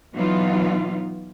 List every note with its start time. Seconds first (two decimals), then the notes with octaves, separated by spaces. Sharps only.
0.14 B2 E3 F#3 B3 D#4 F4